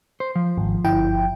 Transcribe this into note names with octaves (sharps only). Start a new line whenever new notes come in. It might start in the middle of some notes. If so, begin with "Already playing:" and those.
C5
F3
G#1
G1 E4 G5